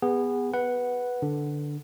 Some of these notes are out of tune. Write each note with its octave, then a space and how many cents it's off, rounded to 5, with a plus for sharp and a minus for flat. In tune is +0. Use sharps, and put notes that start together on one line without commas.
B3 +0 G#4 -25 F#5 +0
B4 -5 F#5 +0
D3 +0 D4 +0